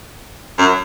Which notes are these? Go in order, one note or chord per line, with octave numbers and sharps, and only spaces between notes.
F#2